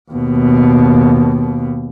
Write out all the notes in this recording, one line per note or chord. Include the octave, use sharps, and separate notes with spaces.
D#2 B2